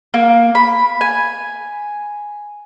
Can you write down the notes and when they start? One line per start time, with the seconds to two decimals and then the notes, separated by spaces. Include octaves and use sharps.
0.14 A#3
0.55 B5
1.01 G#5